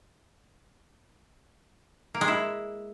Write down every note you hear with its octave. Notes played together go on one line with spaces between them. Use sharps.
A#3
G#3
E4